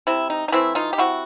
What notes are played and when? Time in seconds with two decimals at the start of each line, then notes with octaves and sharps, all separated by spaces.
0.07 C3 E4
0.30 D#4
0.48 D#4
0.52 E3 A3 C4 E4
0.75 D#4 F4
0.93 G4
0.98 C3 E4 F#4